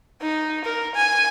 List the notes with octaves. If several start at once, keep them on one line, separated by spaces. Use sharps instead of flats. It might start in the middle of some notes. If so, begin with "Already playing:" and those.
D#4
A#4
G#5